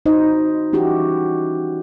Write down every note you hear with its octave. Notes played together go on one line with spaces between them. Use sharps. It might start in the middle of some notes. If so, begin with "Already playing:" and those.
D#4 F#4 C5 D#5
E3 C#4 E4 F#4 G4